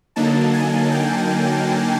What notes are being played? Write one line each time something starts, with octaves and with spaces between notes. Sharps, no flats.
D3 F#3 A#3 D#4 A5
G#5
G5